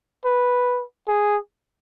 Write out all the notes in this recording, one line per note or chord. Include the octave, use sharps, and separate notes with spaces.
B4
G#4